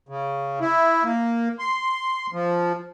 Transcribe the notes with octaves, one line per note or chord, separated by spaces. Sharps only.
C#3
E4
A#3
C6
F3